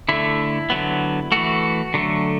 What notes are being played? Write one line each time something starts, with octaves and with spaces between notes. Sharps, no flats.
D3 A3 E4
D3 F#3 B3
E3 A3 F#4
D3 F#3 A3